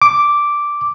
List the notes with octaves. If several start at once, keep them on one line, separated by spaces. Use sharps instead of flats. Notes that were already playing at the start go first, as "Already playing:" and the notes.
D6